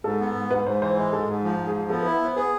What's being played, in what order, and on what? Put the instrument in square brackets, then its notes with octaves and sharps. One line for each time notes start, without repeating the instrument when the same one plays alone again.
[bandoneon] G#2 [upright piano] A4
[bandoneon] B3
G#2
[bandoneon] G#2 [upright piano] B4
[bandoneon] G#2 [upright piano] C5
[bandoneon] E3 [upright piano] C5
[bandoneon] G#3 [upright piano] C5
[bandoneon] G#2 [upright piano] A4
[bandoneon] G#2 [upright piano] G#4
[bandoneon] F3
G#2
[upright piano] G#4
[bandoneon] F3
[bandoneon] B3 [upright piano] A4
[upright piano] B4
[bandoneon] E4
[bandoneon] B3 [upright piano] C5
[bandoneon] G#4 [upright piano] B4